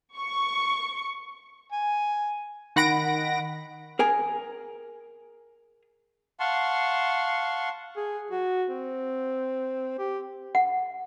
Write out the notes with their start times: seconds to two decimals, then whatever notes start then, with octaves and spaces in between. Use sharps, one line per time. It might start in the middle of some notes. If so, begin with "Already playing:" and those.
0.17 C#6
1.72 G#5
2.76 D#3 F#5 B5 A#6 D7
3.99 G#4 A#4 G#5
6.40 F5 F#5 A5 C6 C#6
7.96 G#4
8.31 F#4
8.70 C4
9.99 G4
10.55 F#5